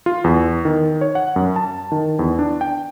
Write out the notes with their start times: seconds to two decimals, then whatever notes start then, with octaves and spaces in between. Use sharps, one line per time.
0.06 F4
0.24 E2
0.65 D#3
1.01 C#5
1.15 F#5
1.36 F#2
1.56 A5
1.92 D#3
2.19 E2
2.39 D4
2.61 G5